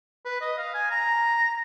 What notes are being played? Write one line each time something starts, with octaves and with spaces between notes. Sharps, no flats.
B4
D#5
F5
G#5
A#5